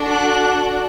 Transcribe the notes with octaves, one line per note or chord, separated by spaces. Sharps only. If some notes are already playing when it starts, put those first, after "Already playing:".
Already playing: D4 F#4 A4
F#6